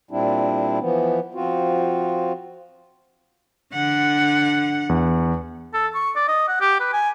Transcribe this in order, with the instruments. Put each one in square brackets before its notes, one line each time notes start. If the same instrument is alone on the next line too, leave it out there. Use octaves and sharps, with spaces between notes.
[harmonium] A#2 G3 C4 D4 E4
E3 F3 B3
F3 C4 F4 F#4
[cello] D3 F#5
[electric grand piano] E2
[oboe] A4
C#6
D5
D#5
F#5
G4
B4
G#5